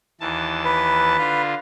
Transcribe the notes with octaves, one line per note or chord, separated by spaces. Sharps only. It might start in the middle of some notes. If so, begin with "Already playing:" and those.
D#2 E3 A5
B4
D3 F4